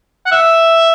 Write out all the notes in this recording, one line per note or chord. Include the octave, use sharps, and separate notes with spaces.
F#5
E5